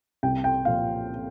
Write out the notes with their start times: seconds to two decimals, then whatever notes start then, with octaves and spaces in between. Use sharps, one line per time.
0.23 C2 G5
0.44 G5
0.65 A#2 F3 F5